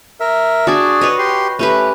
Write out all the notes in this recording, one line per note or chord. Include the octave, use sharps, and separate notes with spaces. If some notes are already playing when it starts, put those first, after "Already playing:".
A#4 E5
D4 F#4 G#4 D5
B4 C#5 D#5
G4 C6
A3 C#4 G4 B4